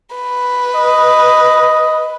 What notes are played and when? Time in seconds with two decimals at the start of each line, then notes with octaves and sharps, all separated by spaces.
0.16 B4
0.75 D#5